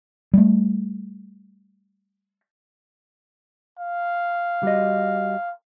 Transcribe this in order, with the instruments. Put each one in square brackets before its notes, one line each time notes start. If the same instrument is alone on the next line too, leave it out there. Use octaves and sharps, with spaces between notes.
[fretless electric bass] G3 A3
[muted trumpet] F5
[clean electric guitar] G3 F#4 D#5